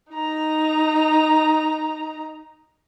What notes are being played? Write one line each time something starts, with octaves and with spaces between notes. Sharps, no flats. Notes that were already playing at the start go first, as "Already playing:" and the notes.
D#4 A#5